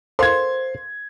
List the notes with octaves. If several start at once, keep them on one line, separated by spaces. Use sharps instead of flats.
A4 A#4 C5 F5 C6 G#6